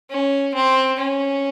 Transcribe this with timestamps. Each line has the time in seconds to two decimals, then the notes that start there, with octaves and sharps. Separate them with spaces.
0.10 C#4
0.55 C4
0.99 C#4